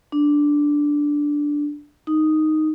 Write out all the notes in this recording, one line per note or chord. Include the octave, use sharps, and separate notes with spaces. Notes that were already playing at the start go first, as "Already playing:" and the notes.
D4
D#4